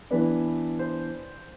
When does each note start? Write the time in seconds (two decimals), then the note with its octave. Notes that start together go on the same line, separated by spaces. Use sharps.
0.11 E3 B3 D4 B4
0.79 C5